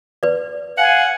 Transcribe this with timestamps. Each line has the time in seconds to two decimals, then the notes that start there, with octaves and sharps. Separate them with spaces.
0.23 B4 D5
0.78 F5 F#5 G#5